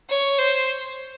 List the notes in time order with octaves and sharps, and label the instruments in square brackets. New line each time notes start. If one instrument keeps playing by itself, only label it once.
[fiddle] C#5
C5